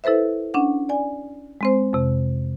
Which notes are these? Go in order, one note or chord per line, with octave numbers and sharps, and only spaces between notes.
E4 A4 B4 C5 E5
C#4 D4 F#5
D5 G#5
G#3 C4 C5
F2 C3